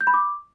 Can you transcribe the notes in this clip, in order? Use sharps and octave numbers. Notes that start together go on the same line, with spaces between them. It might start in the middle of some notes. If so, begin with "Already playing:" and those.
G6
B5
D6